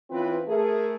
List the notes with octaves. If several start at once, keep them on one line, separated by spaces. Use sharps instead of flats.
E3 C4 C#4 F4 B4
A3 G#4 A#4